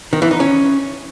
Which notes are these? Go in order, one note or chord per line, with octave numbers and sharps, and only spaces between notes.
D#3
E3
D#4
C#4